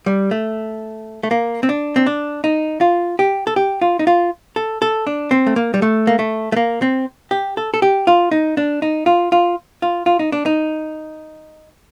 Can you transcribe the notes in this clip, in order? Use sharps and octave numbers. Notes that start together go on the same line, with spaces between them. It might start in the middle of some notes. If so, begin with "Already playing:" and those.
G3
A3
A3
A#3
C4
D4
C4
D4
D#4
F4
G4
A4
G4
F4
D#4
F4
A4
A4
D4
C4
A3
A#3
G3
A3
A#3
A3
A3
A#3
C4
G4
A4
A4
G4
F4
D#4
D4
D#4
F4
F4
F4
F4
D#4
D4
D#4